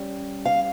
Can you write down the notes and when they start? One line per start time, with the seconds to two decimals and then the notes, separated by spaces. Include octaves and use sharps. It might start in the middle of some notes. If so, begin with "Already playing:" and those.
Already playing: G3 C#4
0.45 F5